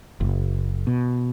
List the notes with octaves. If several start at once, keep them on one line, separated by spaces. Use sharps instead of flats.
F#1
B2